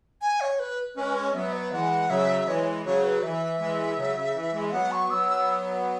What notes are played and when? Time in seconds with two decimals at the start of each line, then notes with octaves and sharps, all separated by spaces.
0.21 G#5
0.41 C#5
0.59 B4
0.96 G#3 C#4 B4
1.16 C#5
1.34 F#3 B3 E5
1.53 B4
1.71 E3 G#3 F#5
2.09 C#3 F#3 E5
2.47 E3 G#3 C#5
2.84 C#3 F#3 C#5
3.04 B4
3.23 E3 E5
3.60 E3 G#3
3.97 C#3 F#3
4.16 C#3
4.34 E3
4.54 E3 G#3
4.69 E5
4.72 F#3 B3 F#5
4.92 C#6
5.10 F#3 B3 E6
5.29 E6